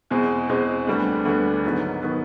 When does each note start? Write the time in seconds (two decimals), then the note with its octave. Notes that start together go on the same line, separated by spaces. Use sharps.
0.11 E2 B2 G#3 C4
0.49 E2 B2 G#3 C4
0.87 D2 D3 G3 B3 D4
1.25 D2 D3 G3 B3 D4
1.64 G#2 D#3 F#3 B3
2.03 D#3 F#3 B3